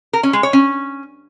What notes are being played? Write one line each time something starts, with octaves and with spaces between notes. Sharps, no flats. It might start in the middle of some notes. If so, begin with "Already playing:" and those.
A#4
C#4
G#3
C#5
C#4